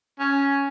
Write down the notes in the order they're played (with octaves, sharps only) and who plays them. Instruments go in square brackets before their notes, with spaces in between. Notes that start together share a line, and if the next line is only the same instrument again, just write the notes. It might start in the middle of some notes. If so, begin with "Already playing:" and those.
[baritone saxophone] C#4